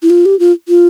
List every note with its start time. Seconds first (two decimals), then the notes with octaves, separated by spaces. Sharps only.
0.03 E4
0.10 F4
0.26 G4
0.39 F4
0.68 F4